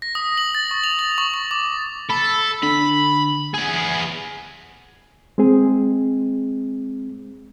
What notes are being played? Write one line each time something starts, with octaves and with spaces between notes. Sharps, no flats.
A#6
D#6
F#7
A6
C#6
F7
F#7
C#6
C#6
D6
A4 B5
D3 B5
B3 G#4 G#5
G#3 C4 G#4